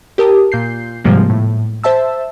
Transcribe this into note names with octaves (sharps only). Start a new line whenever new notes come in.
G4 A#4 A5 D#6
A#2 G6 C7
G#2 C3 F3 G3 G#3 A#3
A2
C5 E5 A5 E6